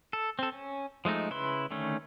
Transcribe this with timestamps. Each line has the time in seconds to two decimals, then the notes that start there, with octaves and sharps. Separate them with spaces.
0.13 A4
0.39 C4 A4
0.52 C#4
1.05 F3 G#3 A3 D#4
1.30 C#3 E4 B4 C6
1.71 D3 D#3 A3 C#4